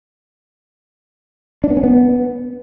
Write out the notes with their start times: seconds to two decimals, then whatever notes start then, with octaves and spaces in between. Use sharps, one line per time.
1.64 D4
1.70 B3
1.77 C#4
1.83 B3